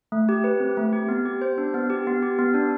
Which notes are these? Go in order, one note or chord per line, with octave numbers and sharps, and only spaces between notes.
A3
G4
B4
C4
A3
G4
B3
G4
C5
D4
B3
G4
B3
G4
B3
D4